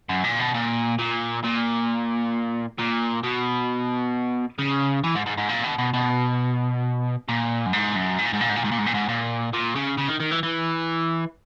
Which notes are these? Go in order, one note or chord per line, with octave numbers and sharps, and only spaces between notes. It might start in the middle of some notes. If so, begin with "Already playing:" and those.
F#2
A#2
B2
A#2
A#2
A#2
A#2
B2
C#3
E3
G#2
G#2
G#2
A#2
B2
B2
B2
A#2
F#2
G#2
F#2
G#2
A#2
G#2
A#2
G#2
A#2
G#2
A#2
G#2
A#2
G#2
A#2
A#2
C#3
C#3
D#3
D#3
E3
E3